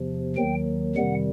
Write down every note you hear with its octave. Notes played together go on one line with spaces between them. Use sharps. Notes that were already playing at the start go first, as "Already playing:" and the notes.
Already playing: E2 C3 F3
D#2 D#3 F#3 G5
F2 C3 D#3 G3 F#5